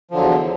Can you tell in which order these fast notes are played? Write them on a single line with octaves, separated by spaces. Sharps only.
F3 D3 F#3 E2